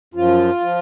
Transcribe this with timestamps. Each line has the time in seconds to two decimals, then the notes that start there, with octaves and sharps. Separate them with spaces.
0.14 F#2 F3 F4
0.60 F3